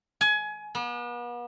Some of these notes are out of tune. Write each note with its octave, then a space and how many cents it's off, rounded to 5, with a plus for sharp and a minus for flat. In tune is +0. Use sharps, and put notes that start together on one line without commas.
G#5 +25
B3 -40